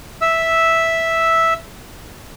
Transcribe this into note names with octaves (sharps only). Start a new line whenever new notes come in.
E5 E6